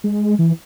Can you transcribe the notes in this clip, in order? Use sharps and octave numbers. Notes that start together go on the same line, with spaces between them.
G#3
E3